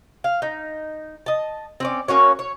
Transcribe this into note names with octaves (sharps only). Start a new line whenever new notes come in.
F5
D#4
D#5 A5
C4 C#4 D5
A#3 C#4 F#4 C#5
C#5